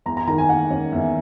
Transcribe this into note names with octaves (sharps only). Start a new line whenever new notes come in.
E2 A#5
A#5
D#3 A#5
G#5
A#3 F#5
C#4
E2 E5